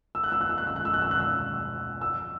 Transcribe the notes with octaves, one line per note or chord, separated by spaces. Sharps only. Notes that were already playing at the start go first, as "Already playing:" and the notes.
E6
F#6
E6
F#6
E6
F#6
E6
F#6
E6
F#6
E6
F#6
E6
E6